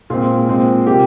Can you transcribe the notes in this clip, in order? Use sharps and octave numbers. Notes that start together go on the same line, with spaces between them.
A#2 G#3 C4 F4
A#2 G#3 C4
C3 F3 A#3 G4